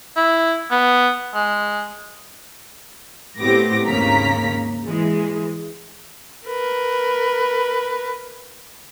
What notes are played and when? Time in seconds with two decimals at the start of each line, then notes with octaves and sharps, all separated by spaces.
0.17 E4
0.71 B3
1.34 G#3
3.40 A2 B3 C4 G4 D6 A#6
3.87 G#1 D#2 C#3 A#3 A#5 B6
4.86 E3 G#3
6.47 A#4 B4